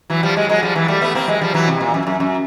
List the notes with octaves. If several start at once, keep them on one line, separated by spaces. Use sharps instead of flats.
E3 F#3
F3 G3
F#3 G#3
F#3 G#3
F3 G3
E3 F#3
G3 A3
A3 B3
A#3 C4
F#3 G#3
F3 G3
E3 F#3
C3
A#2
F#2
F#2
F#2